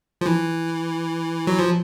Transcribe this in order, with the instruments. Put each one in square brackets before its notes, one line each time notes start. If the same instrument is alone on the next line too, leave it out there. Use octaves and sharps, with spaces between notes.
[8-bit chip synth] F3
E3
F#3
F3